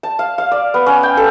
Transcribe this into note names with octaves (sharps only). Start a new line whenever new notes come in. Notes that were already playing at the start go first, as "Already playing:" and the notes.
A5
F5
F5
D5
B3
C#4
G5
A4